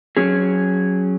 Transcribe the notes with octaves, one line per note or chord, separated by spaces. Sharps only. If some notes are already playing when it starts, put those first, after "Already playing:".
F#3 C#4 G#4